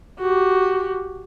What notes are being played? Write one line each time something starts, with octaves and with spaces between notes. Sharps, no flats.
F#4 G4